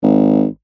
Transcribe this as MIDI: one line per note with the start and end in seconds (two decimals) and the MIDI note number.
0.03 0.45 32